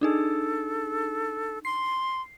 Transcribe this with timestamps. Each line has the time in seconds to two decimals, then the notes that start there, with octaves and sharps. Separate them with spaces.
0.01 D4 D#4 G#4 A4
1.65 C6 C7